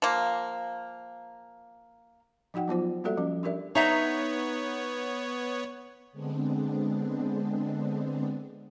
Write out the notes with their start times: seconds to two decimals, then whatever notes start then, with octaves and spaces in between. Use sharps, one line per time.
0.02 F3 A#3
2.54 F3 D#4 F#4 F#5 G5
2.68 F#3 B3 F4 C5
3.04 G3 A#3 F#4 A4 D5 E5
3.17 F3 C#4
3.43 D4 G4 A#4 D5 E5
3.75 B3 D#4 C#5 E5 A#5
6.12 D3 G#3 B3 C4 D4